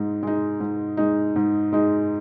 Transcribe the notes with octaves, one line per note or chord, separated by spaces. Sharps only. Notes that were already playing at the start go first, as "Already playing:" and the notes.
Already playing: G#2 G#3 D#4
G#3 D#4
G#2
G#3 D#4
G#2
G#3 D#4